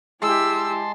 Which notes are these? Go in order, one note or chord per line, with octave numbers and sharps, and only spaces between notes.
G#3 E4 G4 A5 C6 E6